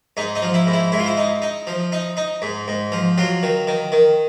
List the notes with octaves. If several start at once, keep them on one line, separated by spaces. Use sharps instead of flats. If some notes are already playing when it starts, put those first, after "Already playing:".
G#2 D#4
D#4
F3
E4
G#2
E4
G#2 E4
F4
E4
D#4
D#4
F3
D#4
D#4
G#2
G#2
F3
F#3 F4
D#3
D#3
D#3